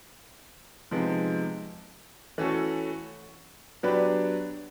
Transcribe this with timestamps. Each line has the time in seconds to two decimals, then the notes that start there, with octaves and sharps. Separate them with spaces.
0.91 C3 F3 G#3 B3 D#4
2.38 E3 A3 C#4 F#4 A4
3.83 F#3 B3 D4 G4 B4